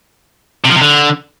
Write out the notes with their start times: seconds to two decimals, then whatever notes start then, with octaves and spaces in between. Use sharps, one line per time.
0.64 C3
0.70 F3
0.75 C3
0.81 D3